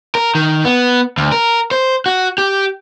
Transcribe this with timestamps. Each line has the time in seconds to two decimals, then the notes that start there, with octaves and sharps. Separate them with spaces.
0.15 A#4
0.35 D#3
0.65 B3
1.18 D2
1.32 A#4
1.71 C5
2.06 F#4
2.38 G4